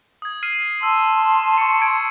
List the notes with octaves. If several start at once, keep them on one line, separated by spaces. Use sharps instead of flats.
D#6 G#6
F6 C7 D#7
A5 C6 E6
C#6 C#7
G#6 C7 D7